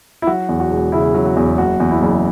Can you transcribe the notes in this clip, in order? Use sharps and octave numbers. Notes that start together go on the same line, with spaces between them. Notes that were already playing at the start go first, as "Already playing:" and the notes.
E4
F#3 F#4
E2
F#4
E1
C#3 E4
F#3
F#4
E2
F#1 F#4
E2
E4
F#1